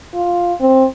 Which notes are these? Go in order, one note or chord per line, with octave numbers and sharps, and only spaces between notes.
F4
C4